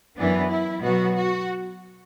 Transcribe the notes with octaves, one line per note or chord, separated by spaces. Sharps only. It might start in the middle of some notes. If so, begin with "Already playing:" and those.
F#2 E3 B3 D4
E4
B2 F#3 B3 F#4
F#4